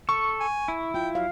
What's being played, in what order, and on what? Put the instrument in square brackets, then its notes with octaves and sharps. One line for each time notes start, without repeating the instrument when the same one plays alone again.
[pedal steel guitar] A4 [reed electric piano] C#6
[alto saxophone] G#5
[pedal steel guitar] E4
[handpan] F4 [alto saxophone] G5
[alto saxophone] F#3 [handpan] F5